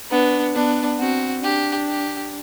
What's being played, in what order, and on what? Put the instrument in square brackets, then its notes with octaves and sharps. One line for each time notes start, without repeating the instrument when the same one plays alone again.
[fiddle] B3 [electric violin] D4
[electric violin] B3 [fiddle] D4
[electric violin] C4 [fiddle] F#4
[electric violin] D4 [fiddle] G4
[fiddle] G4